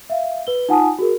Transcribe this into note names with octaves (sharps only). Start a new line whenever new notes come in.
E5 F5
B4 G7
D#4 F4 F#5 G#5 A5 D#6
F#4 G#4 A#4